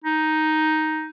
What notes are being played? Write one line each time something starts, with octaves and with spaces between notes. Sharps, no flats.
D#4